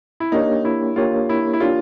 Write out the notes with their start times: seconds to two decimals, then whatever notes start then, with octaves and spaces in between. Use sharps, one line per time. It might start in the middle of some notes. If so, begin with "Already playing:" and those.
0.20 E4
0.32 A#3 D4 D#4 G4 A#4 C#5
0.65 E4
0.96 A#3 D4 F4 G4 A#4 C#5
1.29 E4
1.53 E4
1.60 A#3 D4 F4 G4 A#4 C#5